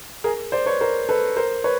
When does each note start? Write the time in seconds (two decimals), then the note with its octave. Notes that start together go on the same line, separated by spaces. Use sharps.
0.24 G#4 A#4
0.52 C5 D5
0.66 B4 C#5
0.81 A#4 C5
1.09 A4 B4
1.36 A#4 C5
1.64 B4 C#5